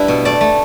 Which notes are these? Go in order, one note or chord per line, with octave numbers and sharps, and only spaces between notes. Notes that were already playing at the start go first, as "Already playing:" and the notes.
Already playing: G3 D4 E4 G4 B4
B2
A3 D5
A3